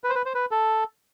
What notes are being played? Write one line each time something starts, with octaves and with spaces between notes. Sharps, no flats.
B4
C5
B4
C5
B4
A4